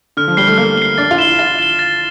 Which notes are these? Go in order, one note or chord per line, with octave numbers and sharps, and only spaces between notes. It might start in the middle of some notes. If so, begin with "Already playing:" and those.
D3 F6
F3
G3 C7 G7
A3
A#3 F6
C7 G7
D4 A6
F4
E4 E7 G7
F4 A6
E7 G7
A6